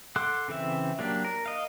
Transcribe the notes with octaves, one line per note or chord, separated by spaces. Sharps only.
A4 F#5 C6 D6 F#6
C#3 E3 C4 E5
F#3 A#3 D4 G4
A#4
D#5 F5